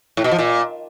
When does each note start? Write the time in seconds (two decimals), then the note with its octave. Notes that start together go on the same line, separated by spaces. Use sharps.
0.17 A2
0.24 B2
0.31 F3
0.39 A#2